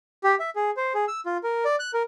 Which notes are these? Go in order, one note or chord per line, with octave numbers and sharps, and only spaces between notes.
G4
E5
G#4
C5
G#4
E6
F4
A#4
D5
F#6
A#4